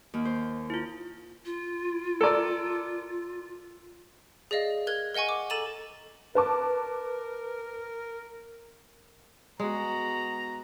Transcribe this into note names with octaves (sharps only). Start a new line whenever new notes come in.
D#2
C5
E4 F4
F4
A4 A#4 D5
G#4 D5 D#5 F5
A#4 F#6 G#6
A#4 D#5 F#5 G#5 C#6
D6
A4 A#5 A6 D#7 E7 F#7
A#4 B4 A5 D6
G#3 B3 F#4 A#5